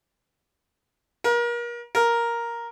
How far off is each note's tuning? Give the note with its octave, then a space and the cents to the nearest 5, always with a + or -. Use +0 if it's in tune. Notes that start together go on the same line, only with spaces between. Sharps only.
A#4 +35
A#4 +5